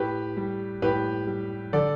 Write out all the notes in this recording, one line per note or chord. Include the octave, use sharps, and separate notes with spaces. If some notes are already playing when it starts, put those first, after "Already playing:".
Already playing: A2 G4 B4
G3
A2 G4 B4
G3
D3 A4 D5